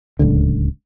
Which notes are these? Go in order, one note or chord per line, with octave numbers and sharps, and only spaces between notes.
D1 C#2 D3